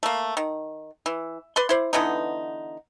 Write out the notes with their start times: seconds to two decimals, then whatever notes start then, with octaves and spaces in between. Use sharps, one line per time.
0.03 A3 A#3
0.37 D#3
1.06 E3
1.56 B4 D5 C6
1.69 E4 C5 D5
1.93 D3 E3 B3 D#4